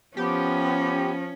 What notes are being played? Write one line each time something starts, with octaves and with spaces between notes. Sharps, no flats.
F3 B3 C#4 G4